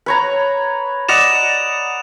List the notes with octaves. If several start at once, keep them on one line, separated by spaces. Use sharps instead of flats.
B4 C#5 A#5
D5 D#5 F#5 E7 F7